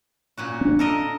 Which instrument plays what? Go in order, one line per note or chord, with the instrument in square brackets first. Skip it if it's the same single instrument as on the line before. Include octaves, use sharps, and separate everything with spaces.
[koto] A#2 C#4 F#4
[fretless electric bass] C4 D4
[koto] A4 A#4 D#5